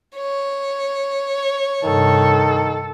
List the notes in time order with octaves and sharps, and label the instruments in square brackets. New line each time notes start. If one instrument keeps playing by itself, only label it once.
[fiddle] C#5
[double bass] G2 C3 [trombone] D#3 [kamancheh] A4